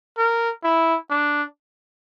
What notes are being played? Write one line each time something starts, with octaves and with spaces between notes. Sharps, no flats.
A#4
E4
D4